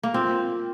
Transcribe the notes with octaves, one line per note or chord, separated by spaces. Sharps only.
A#3
C4 F4